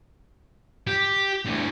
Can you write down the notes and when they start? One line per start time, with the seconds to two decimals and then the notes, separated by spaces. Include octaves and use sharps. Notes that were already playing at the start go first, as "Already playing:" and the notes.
0.87 G4
1.46 D2 E3